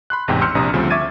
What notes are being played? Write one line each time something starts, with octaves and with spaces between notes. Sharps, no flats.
B5 C6 F#6
A1 E2 G#2 C3 G5
C6 E6 F6 G6 C#7
A#1 C3 D4 A#5 D#6
D2 C#3 F3 G3 C4
E5 C#6 D6 G#6 A6 D#7